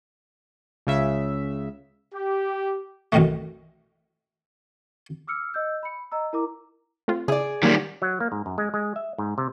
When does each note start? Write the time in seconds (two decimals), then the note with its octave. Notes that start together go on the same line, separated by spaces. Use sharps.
0.87 C#2 C#3 E5
2.14 G4
3.12 B1 F#2 A2 D#3 E3 A3
5.27 D6 E6 F6 C#7
5.54 D#5 E6 G6
5.83 B5 C#7
6.12 D#5 A#5 E6
6.33 E4 A#4 A#5 D6
7.08 A3 C4 F4
7.28 C#3 E4 G#4 D5
7.63 D#3 F#3 G3 A#3 G#6
8.02 F#3
8.20 A#3
8.32 G#2
8.46 F#2
8.58 G#3
8.74 G#3
8.96 E5
9.18 G#2
9.38 C3